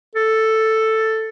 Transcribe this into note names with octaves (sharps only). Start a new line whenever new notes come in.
A4